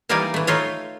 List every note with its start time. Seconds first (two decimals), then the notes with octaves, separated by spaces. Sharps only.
0.09 E3 G3 A#3 D#4 D5 G#5
0.34 E3 A3
0.47 A3 D#4 F4 C#5